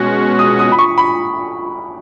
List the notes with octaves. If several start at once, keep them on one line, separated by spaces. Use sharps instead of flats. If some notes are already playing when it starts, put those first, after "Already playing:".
Already playing: B2 G#3 C#4 F#4
D#6
D#6
B5
C#6
B5